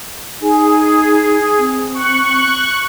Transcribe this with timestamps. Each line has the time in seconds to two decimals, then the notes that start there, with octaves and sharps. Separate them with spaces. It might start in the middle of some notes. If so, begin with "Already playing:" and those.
0.41 D#4 G#4
1.59 C4
1.94 C#6 F#6